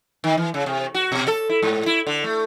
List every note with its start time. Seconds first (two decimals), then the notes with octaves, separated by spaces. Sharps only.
0.24 D#3
0.37 E3
0.54 C#3
0.66 C3
0.94 F#4
1.12 B2
1.28 A4
1.49 E4
1.62 G#2
1.86 E4
2.07 D3
2.24 A3